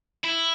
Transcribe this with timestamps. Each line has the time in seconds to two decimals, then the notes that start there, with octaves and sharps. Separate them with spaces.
0.24 E4